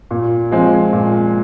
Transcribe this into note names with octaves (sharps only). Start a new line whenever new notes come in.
A#2
F3 G#3 C4
A#2